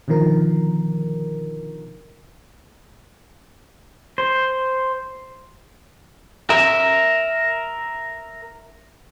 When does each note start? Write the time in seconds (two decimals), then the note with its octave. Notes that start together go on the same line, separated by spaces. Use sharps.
0.08 B2 D3 D#3 F3 A#4
4.18 C5
6.50 A#4 E5